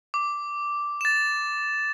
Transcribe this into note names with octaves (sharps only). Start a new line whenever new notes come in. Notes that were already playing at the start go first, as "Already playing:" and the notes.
D6
A6 E7